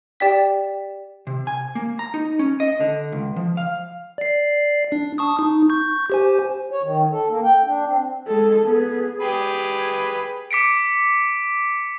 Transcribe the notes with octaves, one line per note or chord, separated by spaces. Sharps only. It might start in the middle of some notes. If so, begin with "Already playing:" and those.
G4 D5 G5 B6
C3
G#5
A#3
A#5
D#4
C#4
D#5
D3
C#2
F3
F5
D5 C7
D4
A5 C#6 D#6
D#4
C#6 G6
G4 C5 G#5
C#5
D#3
A4
A#3
G5
D4
C4
G#3 A4
B3 G#4
G4 G#4 B4
D6 B6 C#7 D7